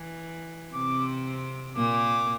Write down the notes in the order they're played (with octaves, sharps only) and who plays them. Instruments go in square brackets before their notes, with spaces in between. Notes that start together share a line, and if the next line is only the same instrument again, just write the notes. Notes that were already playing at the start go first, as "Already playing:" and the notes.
Already playing: [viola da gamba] E3
[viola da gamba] C3 C4 [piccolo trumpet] D6
[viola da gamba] A#2 A#3 [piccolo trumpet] D6